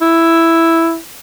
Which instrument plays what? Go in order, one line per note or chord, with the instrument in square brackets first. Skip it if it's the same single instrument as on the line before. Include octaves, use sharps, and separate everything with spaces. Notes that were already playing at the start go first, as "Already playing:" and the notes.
[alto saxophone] E4